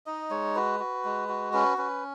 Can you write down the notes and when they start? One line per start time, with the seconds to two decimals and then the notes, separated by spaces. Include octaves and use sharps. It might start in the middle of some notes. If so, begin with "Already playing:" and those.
0.06 D#4 D#5
0.30 G#3 C#5
0.55 F#4 B4
0.80 F#4
1.05 G#3
1.29 F#4
1.53 C#4 B4
1.78 C#4 B4